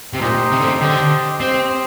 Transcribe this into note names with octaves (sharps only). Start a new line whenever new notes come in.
C3
A#2 D#4 G4 C5 D#5 G5
C3
D3
C3
D3 G4 C5 D#5 G5
C4 G4 C5 D#5 G5